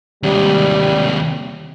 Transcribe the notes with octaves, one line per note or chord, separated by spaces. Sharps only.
D#2 C3 G3